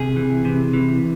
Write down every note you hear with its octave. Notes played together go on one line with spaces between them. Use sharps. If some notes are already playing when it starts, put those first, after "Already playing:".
Already playing: C3 G#4
E3
C3
E3